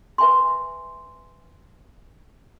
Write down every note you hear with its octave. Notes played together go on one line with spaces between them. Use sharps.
B4 E5 G#5 A#5 C6